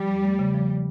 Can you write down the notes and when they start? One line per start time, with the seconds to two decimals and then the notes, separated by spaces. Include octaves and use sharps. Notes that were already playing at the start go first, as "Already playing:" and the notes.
Already playing: F3 G3
0.09 E2
0.24 A3
0.39 C#3
0.54 F3